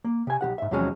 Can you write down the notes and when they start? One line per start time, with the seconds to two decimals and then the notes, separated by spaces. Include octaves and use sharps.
0.04 A#3
0.27 C3 G#5
0.41 B1 D#3 G4 F#5
0.58 G#2 E5
0.71 E2 C3 F3 F#3 G#3 C#4